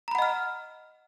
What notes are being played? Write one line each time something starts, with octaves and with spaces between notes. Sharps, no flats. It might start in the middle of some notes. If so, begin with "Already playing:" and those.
D#5 F#5 A#5 B5 F6